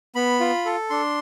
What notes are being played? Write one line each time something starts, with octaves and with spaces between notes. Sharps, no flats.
B3 B5
F4
A4
D4 C6